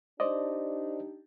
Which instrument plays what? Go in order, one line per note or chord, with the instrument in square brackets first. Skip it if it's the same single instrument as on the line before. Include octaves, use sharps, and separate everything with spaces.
[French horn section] D4 D#4 G4 [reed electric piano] C5 D5 D#5